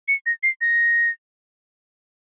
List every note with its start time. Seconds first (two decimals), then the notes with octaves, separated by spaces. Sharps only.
0.08 C#7
0.26 A#6
0.43 C7
0.61 A#6